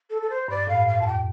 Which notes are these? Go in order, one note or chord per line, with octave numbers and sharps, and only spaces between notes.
A4
A4
C5
G2 D5
A2 F5
G2
F5
F2 A5
G5